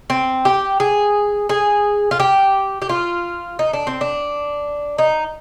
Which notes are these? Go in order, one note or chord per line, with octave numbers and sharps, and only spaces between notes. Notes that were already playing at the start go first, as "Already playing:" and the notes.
C4
G4
G#4
G#4
F4
G4
G4
F4
D#4
D4
C4
D4
D#4